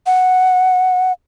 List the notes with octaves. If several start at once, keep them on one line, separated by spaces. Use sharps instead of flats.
F#5